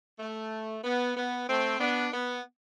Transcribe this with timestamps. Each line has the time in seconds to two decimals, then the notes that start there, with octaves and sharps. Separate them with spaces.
0.19 A3
0.83 B3
1.16 B3
1.48 A3 C4
1.80 B3 D4
2.13 B3